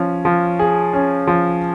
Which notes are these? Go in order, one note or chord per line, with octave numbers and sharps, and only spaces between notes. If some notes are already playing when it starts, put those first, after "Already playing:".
Already playing: F3 C#4
F3
G#4
C#4
F3